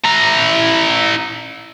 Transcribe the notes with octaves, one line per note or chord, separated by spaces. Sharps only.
E4 A#5